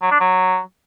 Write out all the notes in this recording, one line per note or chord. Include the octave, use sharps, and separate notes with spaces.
F#3
D4
F#3